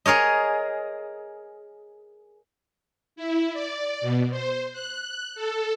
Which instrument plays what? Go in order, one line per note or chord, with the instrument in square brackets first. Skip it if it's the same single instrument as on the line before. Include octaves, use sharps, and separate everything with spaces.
[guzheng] G#4 A#4 C#5 D#5
[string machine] E4
D5
B2
C5
F#6
A4